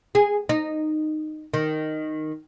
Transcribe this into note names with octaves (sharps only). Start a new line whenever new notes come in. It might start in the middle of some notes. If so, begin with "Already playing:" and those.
G#4
D#4
D#3